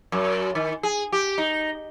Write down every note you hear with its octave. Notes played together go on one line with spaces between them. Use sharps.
F#2
D#3
G#4
G4
D#4